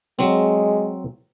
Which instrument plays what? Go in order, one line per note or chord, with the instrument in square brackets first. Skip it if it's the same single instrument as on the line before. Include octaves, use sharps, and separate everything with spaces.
[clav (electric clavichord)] F#3 C4 [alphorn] G#3